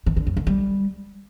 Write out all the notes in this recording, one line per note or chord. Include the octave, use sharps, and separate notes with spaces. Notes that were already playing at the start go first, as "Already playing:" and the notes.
D#3
D3
F#2
D3
G3